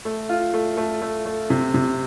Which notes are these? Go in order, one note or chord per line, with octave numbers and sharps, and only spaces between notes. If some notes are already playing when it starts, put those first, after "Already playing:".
A3
F4
A3
A3
A3
A3
C3
C3